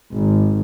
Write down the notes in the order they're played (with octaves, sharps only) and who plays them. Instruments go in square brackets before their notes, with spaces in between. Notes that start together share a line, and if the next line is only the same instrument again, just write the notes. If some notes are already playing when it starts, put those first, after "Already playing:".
[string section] G#1